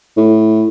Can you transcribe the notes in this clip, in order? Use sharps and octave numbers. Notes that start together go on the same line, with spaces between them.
A2